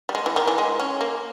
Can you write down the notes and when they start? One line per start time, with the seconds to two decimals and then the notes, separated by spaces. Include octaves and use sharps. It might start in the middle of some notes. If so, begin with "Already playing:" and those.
0.09 G3
0.15 G#3
0.26 E3
0.36 D#3
0.48 E3
0.58 G#3
0.80 C#4
1.01 A#3